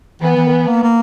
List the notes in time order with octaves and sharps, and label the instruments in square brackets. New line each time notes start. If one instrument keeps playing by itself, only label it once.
[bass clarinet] E3 [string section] B3
[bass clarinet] E3
D#3
E3
A#3
A#3